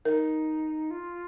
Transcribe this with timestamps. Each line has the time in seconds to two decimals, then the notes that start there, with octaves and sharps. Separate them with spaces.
0.05 D#4 A#4
0.91 F4